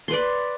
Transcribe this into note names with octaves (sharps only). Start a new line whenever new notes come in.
B4 D5 C6